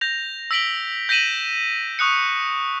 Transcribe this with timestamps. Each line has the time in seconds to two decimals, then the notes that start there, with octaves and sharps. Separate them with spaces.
0.01 G6 A#6 F7
0.51 E6 A#6 B6 D7 F#7 G7
1.09 G6 A#6 B6 D#7 E7 F#7
1.99 C#6 D#6 F#6 C#7